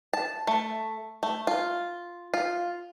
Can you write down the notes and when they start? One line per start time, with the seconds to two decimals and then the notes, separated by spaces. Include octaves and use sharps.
0.13 A5
0.47 A3
1.23 A3
1.47 F4
2.34 F4